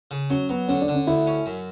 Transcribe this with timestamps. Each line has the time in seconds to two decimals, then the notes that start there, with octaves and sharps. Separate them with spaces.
0.11 C#3
0.30 F#3 C#4
0.49 F#3 B3
0.68 D3 C#4
0.82 D4
0.88 D3
0.94 C#4
1.07 D2 E4
1.27 C#4
1.46 F#2